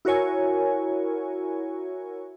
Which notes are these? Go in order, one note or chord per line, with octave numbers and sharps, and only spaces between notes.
E4 F#4 A#4 C#5 G#5